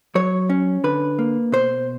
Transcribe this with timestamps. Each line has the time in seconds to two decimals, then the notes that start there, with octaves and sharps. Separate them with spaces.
0.15 F#3 C#5
0.50 C#4
0.84 D3 B4
1.19 A#3
1.52 B2 C5